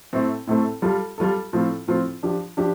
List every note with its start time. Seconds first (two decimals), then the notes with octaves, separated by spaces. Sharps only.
0.13 A2 A3 C4 A4
0.47 A2 A3 C4 A4
0.82 G3 F4 A4
1.18 G3 F4 A4
1.53 A2 F3 C4 F4
1.87 A2 F3 C4 F4
2.23 F3 D4 G4
2.57 F3 D4 G4